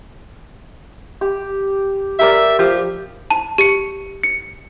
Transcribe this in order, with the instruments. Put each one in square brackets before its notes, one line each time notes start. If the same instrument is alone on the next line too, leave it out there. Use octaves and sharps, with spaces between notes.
[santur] G4
[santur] G4 A#4 D5 [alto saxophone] E5
[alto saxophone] F3 [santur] G4
[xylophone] A5
G4 C#7
C#7